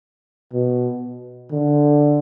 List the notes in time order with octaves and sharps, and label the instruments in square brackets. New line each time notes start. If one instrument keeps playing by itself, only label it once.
[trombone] B2
D3